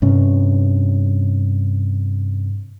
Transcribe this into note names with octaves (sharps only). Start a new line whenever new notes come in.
G2 C3 C#4